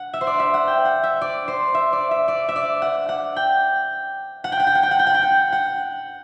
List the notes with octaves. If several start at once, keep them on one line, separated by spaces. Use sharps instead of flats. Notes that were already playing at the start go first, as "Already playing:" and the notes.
Already playing: F#5
E5
C5
D5
E5
F#5
G5
F#5
E5
D5
C5
E5
D5
E5
D5
E5
D5
F#5
F#5
G5
F#5
G5
F#5
G5
F#5
G5
F#5
G5
F#5
G5
F#5
F#5